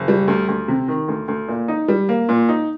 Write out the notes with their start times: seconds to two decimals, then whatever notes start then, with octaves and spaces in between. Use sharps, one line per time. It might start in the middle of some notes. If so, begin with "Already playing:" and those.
Already playing: F#1
0.08 G3
0.28 D2
0.48 D2
0.68 C3
0.88 D#3
1.08 D2
1.28 D2
1.48 A#2
1.68 D#4
1.88 G3
2.09 A#3
2.29 A#2
2.49 D#4